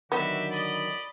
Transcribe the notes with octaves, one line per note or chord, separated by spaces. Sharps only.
D3 D#3 F#3 B3 F#4 G4 E5
D5 D#5 B5